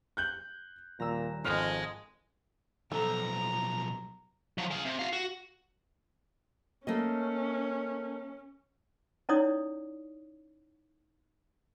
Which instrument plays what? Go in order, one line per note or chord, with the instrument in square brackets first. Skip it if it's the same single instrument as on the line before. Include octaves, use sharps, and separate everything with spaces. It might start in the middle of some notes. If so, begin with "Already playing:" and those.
[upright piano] F#6 G6 F#7
[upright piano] D#1 [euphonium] A#2 [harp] A#5 E6
[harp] G#1 [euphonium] F2 [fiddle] G#3 [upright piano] F6 F#6 F7
[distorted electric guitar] B1 F3 [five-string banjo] A4 [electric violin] A#5
[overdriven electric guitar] F3 F#3
G#3 F5
C3
F#4 F5
F#4
[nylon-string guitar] A3 A#3 D#5 [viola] C#4
[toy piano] C#4 D#4 E4 C#5 D5 D#6